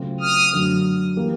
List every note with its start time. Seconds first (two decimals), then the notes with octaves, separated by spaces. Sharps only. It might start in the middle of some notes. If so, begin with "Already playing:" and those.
Already playing: C#3 F#3 A3 C4 F4
0.20 D#6 F6
0.53 F#2 D3 F#3 A3
1.16 E3 G3 A#3